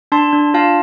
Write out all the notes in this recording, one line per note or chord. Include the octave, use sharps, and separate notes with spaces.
D4 A5 C6
D4
F4 F5 A5